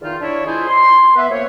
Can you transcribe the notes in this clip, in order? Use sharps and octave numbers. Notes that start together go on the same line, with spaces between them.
E2 D#3 D#4 F4
D4 E4 C#5
G#3 E4 F4 G#4 C5 D5
C6
B3 B4 E5
F#2 A#3 C5 C#5